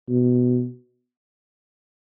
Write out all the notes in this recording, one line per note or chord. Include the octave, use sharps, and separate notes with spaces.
B2